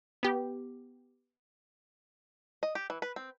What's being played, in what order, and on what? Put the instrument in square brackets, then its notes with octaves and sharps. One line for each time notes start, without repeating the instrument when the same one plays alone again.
[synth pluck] B3 G4
[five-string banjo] D#5
G4
E3
B4
C4